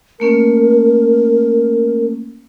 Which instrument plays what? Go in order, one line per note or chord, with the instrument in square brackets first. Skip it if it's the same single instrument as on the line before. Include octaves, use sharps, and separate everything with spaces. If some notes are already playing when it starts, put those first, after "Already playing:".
[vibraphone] A3 A#3 C#4 [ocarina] A#4